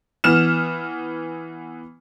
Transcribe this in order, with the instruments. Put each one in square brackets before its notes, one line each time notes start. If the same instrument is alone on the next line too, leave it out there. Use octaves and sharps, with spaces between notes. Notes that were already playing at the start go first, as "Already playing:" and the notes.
[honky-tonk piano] E3 B3 F6 E7